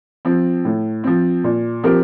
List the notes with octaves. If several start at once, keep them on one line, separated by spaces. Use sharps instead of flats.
F3 C4
A2
F3 C4
A#2
F3 C4 G4 A#4